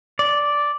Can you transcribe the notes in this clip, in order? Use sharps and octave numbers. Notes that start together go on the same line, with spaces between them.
D5